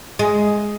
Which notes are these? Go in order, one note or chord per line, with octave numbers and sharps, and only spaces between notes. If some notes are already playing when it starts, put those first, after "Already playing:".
G#3